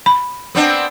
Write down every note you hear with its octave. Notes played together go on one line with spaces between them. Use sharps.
B5
B3 C4 D4